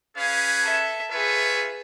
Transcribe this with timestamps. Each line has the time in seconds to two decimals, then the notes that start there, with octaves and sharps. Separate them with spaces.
0.16 C#4 G#4 B4 F5
0.63 A4 E5
1.11 F4 G#4 B4 C#5 E5